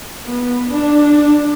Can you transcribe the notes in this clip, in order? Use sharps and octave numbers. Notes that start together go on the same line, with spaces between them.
B3
D4